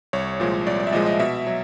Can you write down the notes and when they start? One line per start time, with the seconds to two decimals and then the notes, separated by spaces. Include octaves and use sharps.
0.13 C2 C#5
0.40 A#2 F3 G#3
0.66 C2 D5
0.80 D5
0.87 E5
0.92 A#2 F3 G#3 D#5
1.06 D#5
1.20 B2 E5
1.47 F#3